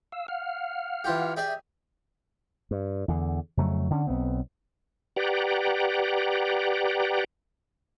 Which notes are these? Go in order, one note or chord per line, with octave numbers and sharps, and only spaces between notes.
F5 E6
F5 F#5 F6
E3 F4 G4
G4 G#4 D5 E5
G2
E2 D3
F2 C#3 F#3 A3
D3 C#4
B1 B3 C4
G4 B4 D5 F#5 G5 A#5